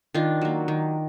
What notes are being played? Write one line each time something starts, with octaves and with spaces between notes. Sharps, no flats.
D#3 D4 F4
F#3 A#3
D#3